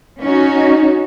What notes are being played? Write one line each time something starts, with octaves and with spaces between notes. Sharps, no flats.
C#4 D#4 F#4